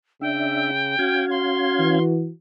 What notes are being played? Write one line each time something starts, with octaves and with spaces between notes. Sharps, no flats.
C#3 D4 E5 G5
C#4 F#4 F5 G#6
C6
E3